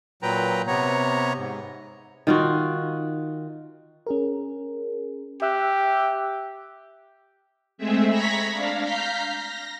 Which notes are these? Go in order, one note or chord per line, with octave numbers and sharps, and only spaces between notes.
A#2 F#3 B4 G5 A#5
C3 B3 C#5 A#5
G#2
D#3 F4 F#4
C#4 G#4 A#4
G4 E5 E6 F#6
G#3 A3 C4 G#4 E5
A#5 B5 C#6 G#6 A#6 B6
D4 F5
F5 A#5 F6 G6 B6
A#6